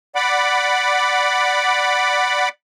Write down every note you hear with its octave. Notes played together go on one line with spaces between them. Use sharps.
D5 F#5 B5 D6